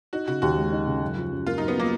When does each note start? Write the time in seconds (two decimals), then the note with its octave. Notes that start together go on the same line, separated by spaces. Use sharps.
0.13 D#4 F#4
0.28 C#3 F#4
0.42 D#2 F#4
0.57 G#3
0.72 D#4
0.86 C#3
1.02 F#2
1.17 F3
1.32 F#2
1.47 A#3 F4
1.58 F#2 D#4
1.68 B3
1.76 F3 A#3